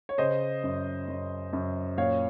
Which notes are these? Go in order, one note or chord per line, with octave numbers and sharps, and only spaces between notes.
C#5
C#3 C5 D#5
F#2
F#2
F#2
A#2 C#5 F5